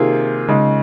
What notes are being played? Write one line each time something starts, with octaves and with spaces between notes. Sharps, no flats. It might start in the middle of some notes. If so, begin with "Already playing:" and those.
Already playing: C3 D#3 A#3 F4 G#4
C#3 G#3 D#4